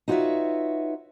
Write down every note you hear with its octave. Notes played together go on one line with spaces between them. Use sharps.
D#4 F4 F#4 B4 C#5 E5